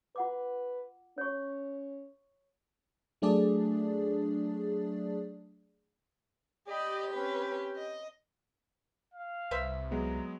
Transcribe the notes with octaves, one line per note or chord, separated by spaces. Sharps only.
F4 B4 F#5 D6
C#4 C#5 C#6
F#3 A3 D4 G#4 D5
G4 D5 D#5 B5
C4 C#4 B4
D#5
F5
C2 B4 C5 E5
F#3 G#3 B3 A#5